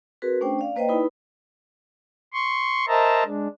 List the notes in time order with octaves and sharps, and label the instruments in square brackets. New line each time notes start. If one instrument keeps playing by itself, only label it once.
[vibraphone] C4 F#4 G#4 A#4 B4
A3 C#4 D4 C5 G5
D5 F5
A#3 B4 C5 D5 D#5 G5
D#4 E4 B4 B5
[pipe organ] C6 C#6
A#4 C5 D#5 E5 A5 A#5
G#3 D4